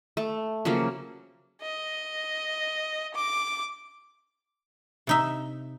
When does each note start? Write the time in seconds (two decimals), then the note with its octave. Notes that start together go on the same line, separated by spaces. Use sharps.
0.17 A3
0.65 C#3 F3 F#3 A#3
1.62 D#5
3.14 D6
5.07 C3 D#4 E5